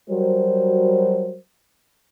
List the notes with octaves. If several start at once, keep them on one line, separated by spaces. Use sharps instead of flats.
F#3 G3 F#4 A#4 C5